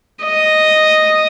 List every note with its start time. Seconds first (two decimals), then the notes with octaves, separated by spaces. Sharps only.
0.24 D#5